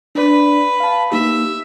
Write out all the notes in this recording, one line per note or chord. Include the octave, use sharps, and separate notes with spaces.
D4 B4 D5
F5 A5
A#3 D#4 G4 E5